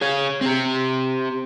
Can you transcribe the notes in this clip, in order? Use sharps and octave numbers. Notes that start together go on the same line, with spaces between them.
G#4 C#5
C4 G4